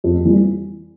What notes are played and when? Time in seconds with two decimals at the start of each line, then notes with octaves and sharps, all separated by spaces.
0.04 F2
0.25 E3 G3